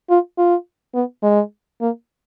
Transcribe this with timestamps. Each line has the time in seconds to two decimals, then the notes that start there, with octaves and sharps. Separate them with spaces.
0.10 F4
0.38 F4
0.95 B3
1.23 G#3
1.81 A#3